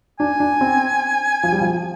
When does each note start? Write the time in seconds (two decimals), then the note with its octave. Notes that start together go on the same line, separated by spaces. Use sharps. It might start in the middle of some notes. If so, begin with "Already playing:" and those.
0.19 D4 G#5
0.40 D4
0.61 C4
1.43 F3
1.52 G3
1.61 F3